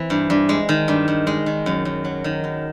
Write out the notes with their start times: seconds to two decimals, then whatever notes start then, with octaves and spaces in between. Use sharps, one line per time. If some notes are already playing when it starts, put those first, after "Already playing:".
Already playing: E3 C4
0.10 G2
0.30 G2
0.49 G#3
0.69 D#3
0.88 G2
1.08 G2
1.27 G#3
1.46 D#3
1.66 F#2
1.85 F#2
2.05 F#3
2.24 D#3
2.44 F#2